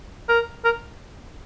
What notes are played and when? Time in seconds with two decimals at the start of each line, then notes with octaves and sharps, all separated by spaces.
0.29 A#4
0.64 A#4